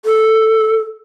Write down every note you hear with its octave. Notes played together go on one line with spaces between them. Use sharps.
A4